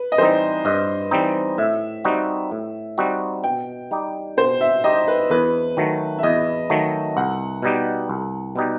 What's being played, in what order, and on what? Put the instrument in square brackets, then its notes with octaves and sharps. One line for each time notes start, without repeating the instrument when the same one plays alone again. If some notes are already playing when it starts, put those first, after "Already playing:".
Already playing: [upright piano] B4
D#5
[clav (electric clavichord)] E3 G3 C4 D#4 [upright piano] C5
[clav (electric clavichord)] G2 [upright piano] D#5
[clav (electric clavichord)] E3 G3 C4 D#4
[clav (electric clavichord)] A2 [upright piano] E5
[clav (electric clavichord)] G3 C4 D#4 F#4
A2
G3 C4 D#4 F#4
[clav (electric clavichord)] B2 [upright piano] G5
[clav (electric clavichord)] G3 D#4 G4
[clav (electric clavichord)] B2 [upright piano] C5
[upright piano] E5
[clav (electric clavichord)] G3 D#4 G4 [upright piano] D#5
[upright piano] B4
[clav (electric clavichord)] E2 [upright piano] B4
[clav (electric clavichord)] D#3 F#3 A3
[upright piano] E5
[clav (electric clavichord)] E2 [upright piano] D#5
[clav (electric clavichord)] D#3 F#3 A3
[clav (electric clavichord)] C2 [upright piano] F#5
[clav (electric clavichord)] B2 G3 D#4 G4
C2
B2 G3 D#4 G4